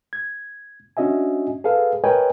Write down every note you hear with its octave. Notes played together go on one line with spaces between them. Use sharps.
G#6
C#4 D4 F#4 D#5 E5 G#5
G#4 A4 B4 F5
A#4 B4 C#5 D#5 G5 G#5